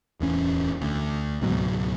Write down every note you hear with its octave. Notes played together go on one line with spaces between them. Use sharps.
D1 E2 C#4
D2
C#2 G#2 B2 F#3